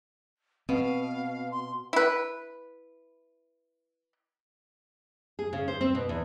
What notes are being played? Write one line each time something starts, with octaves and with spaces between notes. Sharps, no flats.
B2 C4 F5
C6
E4 B4
G#4
C#3
C5
C4
B2
E2